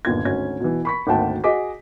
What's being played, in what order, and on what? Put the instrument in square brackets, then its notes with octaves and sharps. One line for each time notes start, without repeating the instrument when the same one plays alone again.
[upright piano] G1 D#2 A#2 G#6
G#1 D2 C#4 G#6
B2 E3
B5 C#6 B6
G#1 D2 A#3 F#5 G5 A5
F#4 G#4 D#5 D6 B6